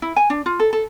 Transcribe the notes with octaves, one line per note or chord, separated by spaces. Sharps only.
E4
G#5
D4
F4
A4
A4